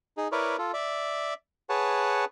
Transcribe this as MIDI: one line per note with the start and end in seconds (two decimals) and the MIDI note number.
0.17 0.28 63
0.17 0.28 68
0.32 0.57 64
0.32 0.57 70
0.32 0.57 71
0.32 0.57 73
0.32 0.57 74
0.58 0.72 65
0.58 0.72 69
0.74 1.34 74
0.74 1.34 76
1.69 2.25 68
1.69 2.25 71
1.69 2.25 73
1.69 2.25 78
1.69 2.25 81